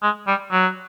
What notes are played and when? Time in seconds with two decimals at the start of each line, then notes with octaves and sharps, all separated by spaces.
0.03 G#3
0.27 G3
0.52 F#3